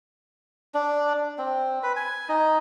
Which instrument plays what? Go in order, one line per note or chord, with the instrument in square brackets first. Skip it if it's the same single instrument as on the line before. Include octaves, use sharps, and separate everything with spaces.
[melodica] D4
C4
B4
G#5
D#4